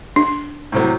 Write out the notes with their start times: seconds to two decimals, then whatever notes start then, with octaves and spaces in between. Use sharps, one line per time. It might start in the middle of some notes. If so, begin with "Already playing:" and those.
0.16 D4
0.72 A2 C3 F#3